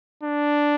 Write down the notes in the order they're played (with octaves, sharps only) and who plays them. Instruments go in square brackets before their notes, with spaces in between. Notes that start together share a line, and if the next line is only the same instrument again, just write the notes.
[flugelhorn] D4